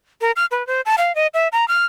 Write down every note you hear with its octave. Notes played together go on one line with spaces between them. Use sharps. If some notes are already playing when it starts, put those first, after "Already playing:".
A#4
F6
B4
C5
A5
F5
D#5
E5
A#5
F6